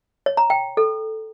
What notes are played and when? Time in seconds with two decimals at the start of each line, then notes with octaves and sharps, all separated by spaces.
0.26 C#5
0.37 A#5
0.50 G5
0.77 A4